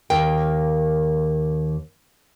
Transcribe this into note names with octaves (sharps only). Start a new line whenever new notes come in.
D#2 A#3 A#4 G5